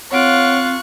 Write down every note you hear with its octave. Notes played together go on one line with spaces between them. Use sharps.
C4 F4 C#5 F5 F#5 C#6 F#6 D7